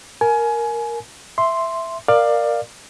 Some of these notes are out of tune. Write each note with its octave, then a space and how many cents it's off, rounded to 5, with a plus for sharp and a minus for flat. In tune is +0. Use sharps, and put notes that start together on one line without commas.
A#4 +0 G#5 +25
E5 +5 C6 +0
A#4 +0 D5 +20 F5 +0